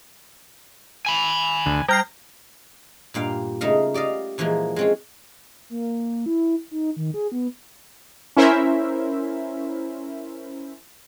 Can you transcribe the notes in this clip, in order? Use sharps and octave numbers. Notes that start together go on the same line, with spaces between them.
G#5 B5
D2
G3 G5 A#5 F6 C7
G2 A#2 F5 G5
C#3 A3 D#4 A#4 F5
G4 D5 D#5 F5
A#2 E3 F3 G#3 A#3
G#3 C4 C#4
A#3
E4
D#4
D#3
G#4
B3
C#4 E4 A#4 C5 E5